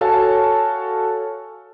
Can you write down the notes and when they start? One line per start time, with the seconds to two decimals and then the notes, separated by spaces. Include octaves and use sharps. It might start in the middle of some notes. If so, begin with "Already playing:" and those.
0.01 F#4 A4 C#5 F5 G#5 A5